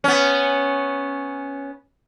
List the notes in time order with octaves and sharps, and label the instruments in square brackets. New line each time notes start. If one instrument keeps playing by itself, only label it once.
[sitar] B3 C#4